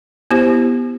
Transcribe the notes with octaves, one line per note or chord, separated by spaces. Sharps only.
B3 E4 G4 C5